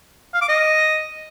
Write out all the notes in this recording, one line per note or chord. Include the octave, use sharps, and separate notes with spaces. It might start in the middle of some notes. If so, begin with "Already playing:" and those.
F5
D6
D#5